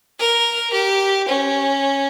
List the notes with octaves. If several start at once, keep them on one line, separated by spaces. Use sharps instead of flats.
A#4
G4
C#4